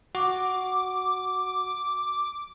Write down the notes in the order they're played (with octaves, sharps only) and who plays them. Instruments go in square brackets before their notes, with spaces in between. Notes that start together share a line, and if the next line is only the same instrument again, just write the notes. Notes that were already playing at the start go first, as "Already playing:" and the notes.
[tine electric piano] F#4 [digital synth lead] D6